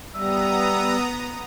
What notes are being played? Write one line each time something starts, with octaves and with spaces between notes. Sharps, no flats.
G3 B3 E5 A#5 D#6